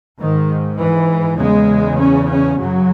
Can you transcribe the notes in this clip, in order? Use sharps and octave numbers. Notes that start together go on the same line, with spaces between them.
G#2 D#3
E3
E2 C#3 G#3
C#4
C#4
F#2 C#3 F#3